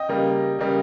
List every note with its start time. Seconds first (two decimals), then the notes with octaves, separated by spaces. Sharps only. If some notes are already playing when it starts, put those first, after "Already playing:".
Already playing: D#5 G5
0.09 C#3 G3 A#3
0.59 C#3 G3 A#3